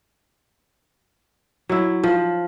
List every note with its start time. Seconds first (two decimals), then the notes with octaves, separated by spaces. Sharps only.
1.69 F#3 E4
2.04 F3